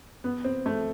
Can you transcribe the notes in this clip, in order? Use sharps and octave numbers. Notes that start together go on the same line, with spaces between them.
B3
C4
A3